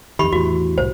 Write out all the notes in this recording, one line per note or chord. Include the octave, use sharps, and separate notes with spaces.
F2 D#3 G4 B5 C#6
E2 A2 E3 F#4
C2 A2 C5